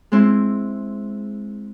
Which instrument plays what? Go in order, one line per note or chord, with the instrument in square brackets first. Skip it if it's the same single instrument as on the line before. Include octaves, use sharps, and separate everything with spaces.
[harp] G#3 C4 E4